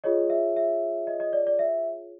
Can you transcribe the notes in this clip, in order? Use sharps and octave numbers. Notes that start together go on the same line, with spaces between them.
F4 G#4 C#5 D#5
E5
E5
D#5
D#5
D5
D5
E5